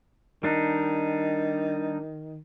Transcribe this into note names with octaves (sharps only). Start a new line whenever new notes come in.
D#3 G3 D4 D#4